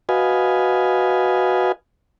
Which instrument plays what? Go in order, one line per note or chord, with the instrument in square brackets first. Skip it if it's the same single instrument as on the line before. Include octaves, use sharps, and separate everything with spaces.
[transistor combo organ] F#4 B4 D#5 F5 G#5